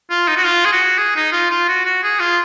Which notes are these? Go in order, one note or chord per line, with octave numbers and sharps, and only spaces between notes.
F4
D#4
F#4
F4
G#4
F#4
G#4
D#4
F4
F4
F#4
F#4
G#4
F4